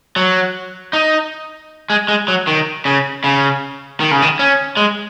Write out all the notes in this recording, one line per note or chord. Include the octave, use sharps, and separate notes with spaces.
F#3
D#4
G#3
G#3
F#3
D#3
C#3
C#3
D#3
C#3
D#3
C#4
G#3